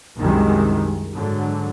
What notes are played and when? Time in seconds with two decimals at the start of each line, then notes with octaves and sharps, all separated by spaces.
0.18 C2 F#2 D#3 G#3
1.13 G#2 D3 F#3